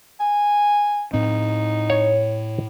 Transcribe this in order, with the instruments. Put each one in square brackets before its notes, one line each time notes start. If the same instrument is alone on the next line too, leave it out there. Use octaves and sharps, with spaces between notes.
[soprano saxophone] G#5
[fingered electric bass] A2 C4 [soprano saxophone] D#4
[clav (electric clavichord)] C#5